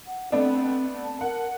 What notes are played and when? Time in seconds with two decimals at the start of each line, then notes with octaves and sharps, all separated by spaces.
0.07 F#5
0.32 A3 B3 C4 D4
1.04 A5
1.21 A#4 F#5